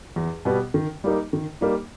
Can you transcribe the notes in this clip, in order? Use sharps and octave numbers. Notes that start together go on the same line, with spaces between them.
E2
B2 G3 B3 G4
D#3
G3 A#3 D#4
D#3
G3 A#3 D#4